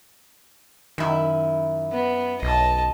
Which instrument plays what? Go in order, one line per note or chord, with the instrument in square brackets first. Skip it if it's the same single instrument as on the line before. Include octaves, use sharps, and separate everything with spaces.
[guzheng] F#2 E4 [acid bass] D#3
[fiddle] B3
[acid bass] B1 [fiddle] D#5 A5